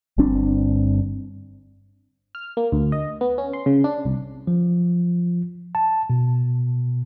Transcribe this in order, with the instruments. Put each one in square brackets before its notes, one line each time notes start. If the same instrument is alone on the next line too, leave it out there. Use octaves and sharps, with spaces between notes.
[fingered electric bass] G1 G2 C4 D4
[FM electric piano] F6
A#3
D2
D#5
B3
C#4
C6
C#3
D4
C2
[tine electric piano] F3
A5
B2